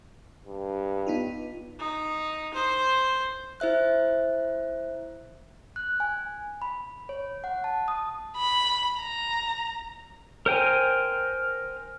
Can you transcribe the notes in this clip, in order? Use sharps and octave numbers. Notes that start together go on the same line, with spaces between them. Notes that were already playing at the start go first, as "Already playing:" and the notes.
G2
B3 D#4 F4
D#4
C5
E4 C5 E5 F#6
F#6
G#5
B5
C#5
F#5
A5
D#6
B5
A#5
A#4 C5 G5 G#5